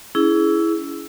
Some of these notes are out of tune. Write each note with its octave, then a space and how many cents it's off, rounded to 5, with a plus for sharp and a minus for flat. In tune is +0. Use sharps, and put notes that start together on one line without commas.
C#4 +35 E4 +0 G#4 +10